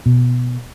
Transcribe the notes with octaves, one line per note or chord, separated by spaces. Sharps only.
B2